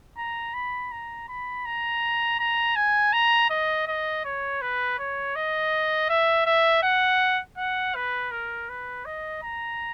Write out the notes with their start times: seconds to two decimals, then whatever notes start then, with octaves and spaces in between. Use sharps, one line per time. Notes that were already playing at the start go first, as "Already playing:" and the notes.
0.17 A#5
0.54 B5
0.92 A#5
1.29 B5
1.65 A#5
2.40 A#5
2.76 G#5
3.13 A#5
3.50 D#5
3.88 D#5
4.25 C#5
4.62 B4
4.99 C#5
5.36 D#5
6.09 E5
6.46 E5
6.83 F#5
7.58 F#5
7.95 B4
8.31 A#4
8.69 B4
9.05 D#5
9.43 A#5